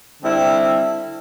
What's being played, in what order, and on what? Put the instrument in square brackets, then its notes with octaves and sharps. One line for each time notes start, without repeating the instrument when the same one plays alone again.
[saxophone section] D3 G3 C4 E4